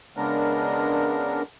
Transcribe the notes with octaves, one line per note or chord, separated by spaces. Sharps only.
C#3 G#3 B3 D4 A#4